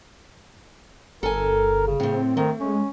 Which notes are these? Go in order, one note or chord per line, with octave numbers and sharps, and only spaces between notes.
G1 A4 A#4 G#5
C#3
A2 A3 C4
D#3 A3
G#3 C#4